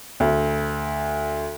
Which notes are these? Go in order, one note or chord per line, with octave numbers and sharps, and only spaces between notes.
D2